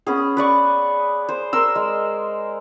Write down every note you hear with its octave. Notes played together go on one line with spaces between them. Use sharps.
B3 C#4 G#4
B4 D5 C#6
C5
A#4 C6 E6
G#3